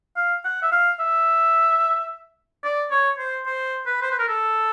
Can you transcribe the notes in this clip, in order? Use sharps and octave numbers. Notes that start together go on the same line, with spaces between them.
F5
F#5
E5
F5
E5
D5
C#5
C5
C5
B4
C5
B4
A#4
A4